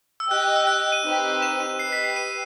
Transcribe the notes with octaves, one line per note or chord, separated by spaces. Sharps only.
E6
G4 D#5 G5 F#6
F#6
E6
F#6
F#6
D#7
C4 D#4 G4 B4
E7
D#7
G4 B4 D#5 C7
B6
C7
D#7